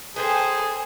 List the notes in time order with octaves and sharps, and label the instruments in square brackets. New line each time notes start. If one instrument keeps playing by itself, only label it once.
[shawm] G#4 [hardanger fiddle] A4 C5 [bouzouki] B4 G5 G#5